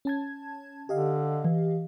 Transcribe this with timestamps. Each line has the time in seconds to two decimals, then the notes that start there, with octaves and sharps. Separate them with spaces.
0.05 C#4 A5 G#6
0.89 D3 G4 D#5 F5
1.45 E3